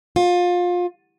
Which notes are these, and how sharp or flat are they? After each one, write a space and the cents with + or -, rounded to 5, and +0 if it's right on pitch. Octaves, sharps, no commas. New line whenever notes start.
F4 +25